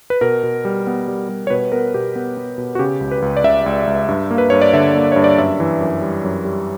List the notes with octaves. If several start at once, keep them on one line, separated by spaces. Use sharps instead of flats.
B4
B2 A#4
B2
G3
B3
G3
G3
C#5
B2 B4
B3 A#4
B2 G4
B3
B3
B2
F#4
C#3 G4
C#2
B4
C#2
D5
C#2 E5
C#2
C#2
G2
A#3
B4
G2 C#5
D5
D3 E5
A#3
G2 C#5
D5
F#2 E5
E3
F#2
G3
F#2
G3